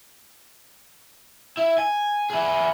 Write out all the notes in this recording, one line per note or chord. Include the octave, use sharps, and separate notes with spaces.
E4
G#5
E4 G#4